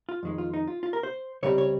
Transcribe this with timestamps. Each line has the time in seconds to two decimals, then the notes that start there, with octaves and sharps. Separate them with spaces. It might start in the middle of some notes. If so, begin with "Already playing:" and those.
0.09 F4
0.23 F2 D#3 G#3
0.38 F4
0.53 D#4
0.67 F4
0.83 F4
0.93 A#4
1.03 C5
1.43 C#2 C3 G3 C4 C#5
1.58 C#5